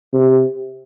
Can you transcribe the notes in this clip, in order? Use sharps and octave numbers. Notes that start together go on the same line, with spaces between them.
C3